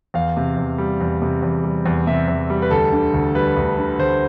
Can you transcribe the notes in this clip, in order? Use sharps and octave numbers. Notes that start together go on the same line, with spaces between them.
E2 F5
C3
E2
G3
E2
C3
E2
G3
E2
C3 E5
E2
G3
B4
D2 A4
D3
D2
G3 B4
D2
D3
D2 C5